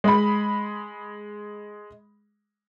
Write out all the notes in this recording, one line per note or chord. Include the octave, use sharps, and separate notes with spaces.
G#3 B5